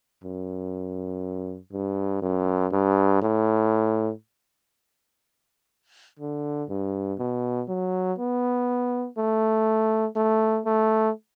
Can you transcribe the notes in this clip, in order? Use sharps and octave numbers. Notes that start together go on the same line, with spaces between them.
F#2
G2
F#2
G2
A2
D3
G2
B2
F#3
B3
A3
A3
A3